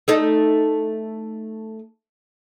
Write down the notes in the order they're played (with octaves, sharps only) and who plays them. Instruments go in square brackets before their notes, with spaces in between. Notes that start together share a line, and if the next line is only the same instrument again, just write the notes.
[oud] A3 D#4 A4